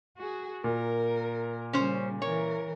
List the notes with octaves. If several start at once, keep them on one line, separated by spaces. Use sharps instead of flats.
F#4 G#4
A#2 A#4
C#3 G3 C#4 C5
E3 A#4 C#5